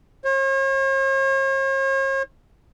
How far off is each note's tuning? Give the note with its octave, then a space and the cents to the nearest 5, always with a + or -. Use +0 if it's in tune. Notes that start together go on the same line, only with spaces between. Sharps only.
C#5 -45